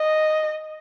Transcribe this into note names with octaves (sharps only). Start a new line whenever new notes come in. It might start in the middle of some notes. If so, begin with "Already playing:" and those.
Already playing: D#5